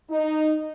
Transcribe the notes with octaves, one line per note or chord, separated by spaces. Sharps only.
D#4